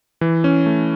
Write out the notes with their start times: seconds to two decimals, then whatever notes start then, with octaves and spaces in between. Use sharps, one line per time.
0.21 E3
0.44 C#4
0.66 A3